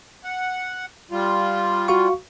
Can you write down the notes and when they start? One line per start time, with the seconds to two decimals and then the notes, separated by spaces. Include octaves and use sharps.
0.24 F#5
1.11 G3 F4
1.88 F#4 F5 C#6